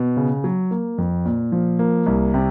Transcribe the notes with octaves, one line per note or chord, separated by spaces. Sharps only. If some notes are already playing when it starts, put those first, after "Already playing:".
Already playing: B2
C#3
F#3
A#3
F2
A#2
F3
A#3
C2
C3